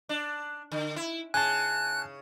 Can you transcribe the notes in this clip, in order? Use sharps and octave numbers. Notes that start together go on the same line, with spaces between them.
D4
D3
E4
C#3 G#5 A5 F#6